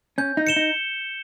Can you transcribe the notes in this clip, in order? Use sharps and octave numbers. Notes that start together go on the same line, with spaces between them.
C#4 G6
D#4
C#7 E7 G7
D#4